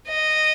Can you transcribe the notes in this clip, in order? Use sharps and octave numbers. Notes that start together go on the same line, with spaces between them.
D#5